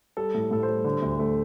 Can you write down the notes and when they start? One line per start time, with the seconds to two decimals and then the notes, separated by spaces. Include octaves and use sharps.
0.17 G3 A4
0.34 A2
0.51 A2 A4
0.63 C5
0.69 G3
0.85 D3
1.02 D2
1.19 A3